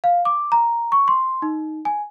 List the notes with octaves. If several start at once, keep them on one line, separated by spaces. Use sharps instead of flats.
F5
D6
A#5
C#6
C6
D#4
G#5